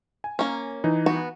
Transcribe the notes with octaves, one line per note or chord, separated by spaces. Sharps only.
G#5
A#3 C#4
E3 D#4
B3 F#4